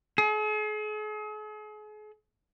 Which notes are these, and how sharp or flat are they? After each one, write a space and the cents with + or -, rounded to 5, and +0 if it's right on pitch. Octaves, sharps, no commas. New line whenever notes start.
G#4 +40